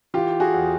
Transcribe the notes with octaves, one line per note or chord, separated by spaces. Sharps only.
E3 F4 G4
F#4 G#4
E2